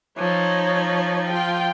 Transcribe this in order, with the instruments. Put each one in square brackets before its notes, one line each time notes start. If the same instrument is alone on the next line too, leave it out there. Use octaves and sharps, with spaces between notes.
[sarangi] F3 [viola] D#4 C#5
[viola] F4 G5